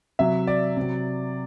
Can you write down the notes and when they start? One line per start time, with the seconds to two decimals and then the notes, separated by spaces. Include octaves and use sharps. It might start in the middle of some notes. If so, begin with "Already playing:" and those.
0.19 C3 F#3 E5
0.47 D5
0.77 C3 F#3